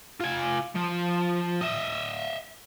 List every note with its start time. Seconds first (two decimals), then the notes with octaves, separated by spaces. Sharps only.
0.20 F4 G#5
0.75 F3
1.61 D#5 E5